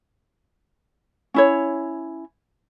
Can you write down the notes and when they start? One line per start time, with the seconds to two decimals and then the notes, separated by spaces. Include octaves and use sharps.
1.34 C#4 E4 C#5